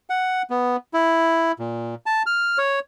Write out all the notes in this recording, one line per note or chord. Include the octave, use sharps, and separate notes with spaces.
F#5
B3
E4
A#2
A5
F6
C#5